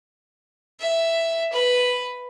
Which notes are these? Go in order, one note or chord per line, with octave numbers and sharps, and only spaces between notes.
E5
B4